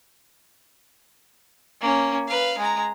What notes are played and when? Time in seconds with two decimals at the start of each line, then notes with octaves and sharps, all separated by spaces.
1.81 A#3 C#4
2.27 B4 F5
2.58 G#3 A#5